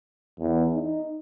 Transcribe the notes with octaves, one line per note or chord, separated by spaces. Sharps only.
E2
D#4